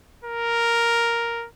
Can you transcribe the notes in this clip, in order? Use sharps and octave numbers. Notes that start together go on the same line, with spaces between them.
A#4